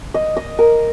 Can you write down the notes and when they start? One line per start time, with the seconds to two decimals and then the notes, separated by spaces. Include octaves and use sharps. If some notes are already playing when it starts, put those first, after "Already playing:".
0.14 D#5
0.37 D#5
0.59 A#4